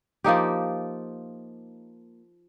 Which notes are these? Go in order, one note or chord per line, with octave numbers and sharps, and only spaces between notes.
F3 A#3 D#4 G4